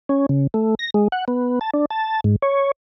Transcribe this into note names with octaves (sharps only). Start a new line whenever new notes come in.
C#4
C#3
A3
A#6
G#3
F#5
B3
A5
D4
A5
G#2
C#5